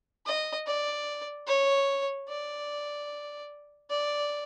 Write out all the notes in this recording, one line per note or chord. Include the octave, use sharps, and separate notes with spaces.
D#5
D5
C#5
D5
D5